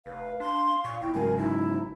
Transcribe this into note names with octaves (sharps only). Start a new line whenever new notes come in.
F1 B4 F5
D4 C6
A#2 C#6
G1 E4 G5
G#2 C#3 F#3 A#4 G#5
G1 D#4 E4